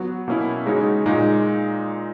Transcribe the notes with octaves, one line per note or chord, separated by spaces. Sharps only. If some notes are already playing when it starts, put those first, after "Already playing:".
Already playing: F#3 B3 F#4
B2 A#3 C#4 E4
C#3 G#3 D#4 F#4 C#5
A#2 G#3 D#4